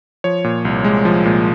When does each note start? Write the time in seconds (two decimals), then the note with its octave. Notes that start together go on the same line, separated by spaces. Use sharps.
0.24 F3 C#5
0.44 A#2
0.65 C2
0.84 G#3
1.05 F3
1.25 A#2